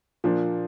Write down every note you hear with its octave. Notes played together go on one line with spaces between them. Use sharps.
A#2 F3 A#3 D4